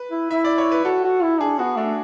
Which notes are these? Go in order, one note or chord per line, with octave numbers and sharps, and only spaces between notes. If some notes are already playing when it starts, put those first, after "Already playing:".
Already playing: B4
E4
E4 E5
D5
C#5
B4
F#4 A4
F#4
E4
D4 G#4
B3 F#4
A3 D4